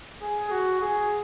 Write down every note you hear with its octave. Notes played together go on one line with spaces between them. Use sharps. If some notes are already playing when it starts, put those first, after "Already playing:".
G#4
F#4
G#4